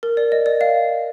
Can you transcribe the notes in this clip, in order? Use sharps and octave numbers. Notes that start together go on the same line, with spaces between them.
A#4
D5
D#5
D5
F5